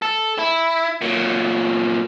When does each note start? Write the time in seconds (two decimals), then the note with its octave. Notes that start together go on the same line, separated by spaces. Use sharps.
0.02 A4
0.38 E4
1.01 A#2 F#3